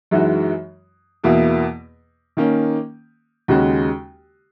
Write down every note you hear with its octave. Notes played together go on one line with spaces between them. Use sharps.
F#2 E3 G#3 D#4 F#4
E2 B2 A#3 E4
D#3 A#3 C#4
D#2 C#3 G#3 C#4 F#4